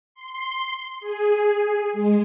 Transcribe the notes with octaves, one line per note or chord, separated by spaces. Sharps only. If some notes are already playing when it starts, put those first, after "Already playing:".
C6
G#4
G#3